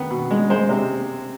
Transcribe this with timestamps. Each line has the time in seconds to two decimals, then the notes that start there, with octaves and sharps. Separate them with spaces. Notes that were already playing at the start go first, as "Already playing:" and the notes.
Already playing: D#3 B3
0.11 B2
0.31 G#3
0.50 G#3 C5
0.69 C3